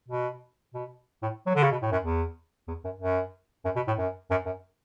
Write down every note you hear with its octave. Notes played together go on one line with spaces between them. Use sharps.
B2
B2
A2
F#3
D3
C#3
B2
A2
F#2
E2
E2
F#2
F#2
F#2
B2
A2
F#2
F#2
F#2